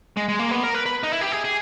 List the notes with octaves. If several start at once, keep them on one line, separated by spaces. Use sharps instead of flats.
G#3
G#3
A#3
B3
A#4
B4
B4
D#4
E4
G4
G#4
G#4